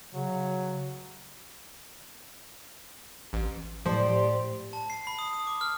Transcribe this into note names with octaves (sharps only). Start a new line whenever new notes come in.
C#3 F#3
A1
A2 F3 G4 C5 D5 C6
A5
C7
B5
D#6
D#6
D6
F6